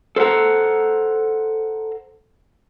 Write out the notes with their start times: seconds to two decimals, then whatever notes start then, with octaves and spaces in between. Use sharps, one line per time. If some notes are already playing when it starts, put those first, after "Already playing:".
0.16 A4 C5 F5 F#5 A#5